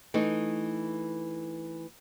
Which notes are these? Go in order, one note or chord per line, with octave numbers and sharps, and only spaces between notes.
E3 A3 D#4